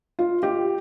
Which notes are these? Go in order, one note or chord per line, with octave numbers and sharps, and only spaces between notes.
F4
G4